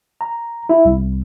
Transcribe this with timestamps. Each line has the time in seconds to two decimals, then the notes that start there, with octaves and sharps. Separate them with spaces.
0.21 A#5
0.69 E4
0.85 C2